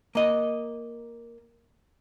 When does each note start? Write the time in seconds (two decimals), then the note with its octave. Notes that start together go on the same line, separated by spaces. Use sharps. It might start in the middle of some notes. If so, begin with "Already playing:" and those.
0.15 A#3 D#5